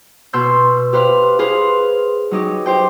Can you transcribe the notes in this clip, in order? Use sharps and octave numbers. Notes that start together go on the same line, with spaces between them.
B2 C6 E6 G6
G4 B4 C5 F5
G#4 B4 C5 F5
F#3 D#4 G4
G4 C5 G5